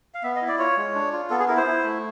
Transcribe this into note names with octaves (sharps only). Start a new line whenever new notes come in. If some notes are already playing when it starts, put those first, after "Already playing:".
F5
B3 E5
D#5
E4
D5
F4 C#5
G#3
D4
F4
B3 A4
G#4
E4 A#4
C5
E4
A3